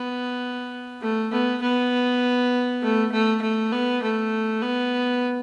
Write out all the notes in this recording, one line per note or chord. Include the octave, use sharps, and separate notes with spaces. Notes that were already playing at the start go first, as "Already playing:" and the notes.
Already playing: B3
A3
B3
B3
A3
A3
A3
B3
A3
B3